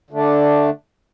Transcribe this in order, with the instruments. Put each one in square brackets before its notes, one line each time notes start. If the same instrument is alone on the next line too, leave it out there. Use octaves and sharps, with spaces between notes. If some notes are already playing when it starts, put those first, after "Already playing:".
[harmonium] D3 A3 D4